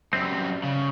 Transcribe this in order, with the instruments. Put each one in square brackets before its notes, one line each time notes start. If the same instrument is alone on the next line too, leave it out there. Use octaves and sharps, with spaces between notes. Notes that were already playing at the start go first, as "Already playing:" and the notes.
[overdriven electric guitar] F#2 G3 [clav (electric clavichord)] C4
[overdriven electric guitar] C#3